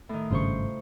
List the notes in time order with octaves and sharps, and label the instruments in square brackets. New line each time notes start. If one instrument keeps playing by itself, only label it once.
[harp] A2 D#3
[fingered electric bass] G#1 G2 C#3 [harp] F4 C5 C#6